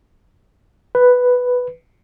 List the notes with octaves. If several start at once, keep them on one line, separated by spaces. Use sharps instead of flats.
B4